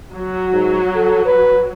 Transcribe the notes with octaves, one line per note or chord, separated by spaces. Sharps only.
F#3
G#2
A4
B4